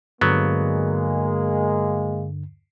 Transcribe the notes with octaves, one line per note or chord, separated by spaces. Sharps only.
G2 D3 F#3 G#3 A#3 B3